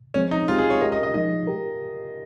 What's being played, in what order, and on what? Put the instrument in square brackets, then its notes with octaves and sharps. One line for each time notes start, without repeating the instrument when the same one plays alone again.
[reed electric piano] F3 G#3 C4 [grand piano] C#4
[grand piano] D#4
[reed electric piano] G#3 C4 G4 [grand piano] F4
[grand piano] G#4
C#5
[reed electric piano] G#3 C#4 G4 A#4 [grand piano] D#5
[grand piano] D#5
D#5
[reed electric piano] F3 G#3 D#4 [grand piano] D#5
[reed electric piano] G4 A#4